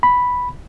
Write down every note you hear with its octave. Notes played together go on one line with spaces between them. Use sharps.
B5